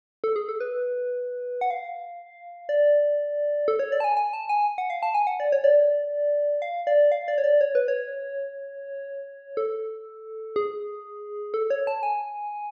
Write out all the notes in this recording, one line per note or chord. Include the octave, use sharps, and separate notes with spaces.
A4
G#4
A4
B4
F#5
F5
D5
A4
C#5
D5
A5
G#5
G#5
A5
G#5
F#5
F5
A5
G#5
F#5
D5
C#5
D5
F5
D5
F5
D5
C#5
D5
C#5
B4
C#5
A4
G#4
A4
C#5
A5
G#5